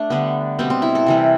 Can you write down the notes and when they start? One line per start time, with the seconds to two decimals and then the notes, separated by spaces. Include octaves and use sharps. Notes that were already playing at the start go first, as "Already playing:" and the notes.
Already playing: A3 D4
0.10 D3 G3 B3
0.59 B2 G3 B3 C4
0.70 C4
0.82 E4
0.95 A4
1.06 C3 E3 G3